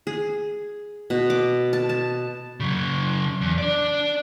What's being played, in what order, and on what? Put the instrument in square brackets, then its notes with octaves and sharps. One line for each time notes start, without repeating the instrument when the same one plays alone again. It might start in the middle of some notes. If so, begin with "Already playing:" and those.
[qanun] G#4
B2
D6
A5
A5
[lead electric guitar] C#3 F#3
E2
D4 D5